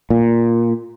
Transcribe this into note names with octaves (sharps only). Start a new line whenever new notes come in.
A#2